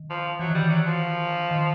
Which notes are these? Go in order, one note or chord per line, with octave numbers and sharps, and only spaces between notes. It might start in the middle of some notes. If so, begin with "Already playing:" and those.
Already playing: D#3
F3
E3 F#3
D#3 G3
E3
F#3
F3
D#3